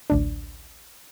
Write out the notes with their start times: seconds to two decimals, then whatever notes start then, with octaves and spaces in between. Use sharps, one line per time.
0.10 A1 D2 D4